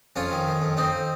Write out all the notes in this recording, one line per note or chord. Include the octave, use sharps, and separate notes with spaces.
F2 C#4 F4
D#3
D#3
F2
F2 C4 D#4